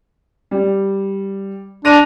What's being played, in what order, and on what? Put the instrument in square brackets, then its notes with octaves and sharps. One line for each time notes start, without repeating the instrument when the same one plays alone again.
[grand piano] G3
[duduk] D4 [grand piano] A#6 D#7 F7